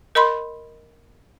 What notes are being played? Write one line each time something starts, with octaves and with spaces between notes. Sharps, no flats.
A#4 D#5 B5 C6